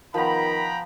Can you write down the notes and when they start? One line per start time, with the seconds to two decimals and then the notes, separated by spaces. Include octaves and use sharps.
0.14 D#3 F3 B3 G5 A#5 B5